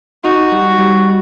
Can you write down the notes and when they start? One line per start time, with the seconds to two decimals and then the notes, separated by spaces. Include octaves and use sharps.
0.24 D#4 F#4
0.52 G3
0.78 G3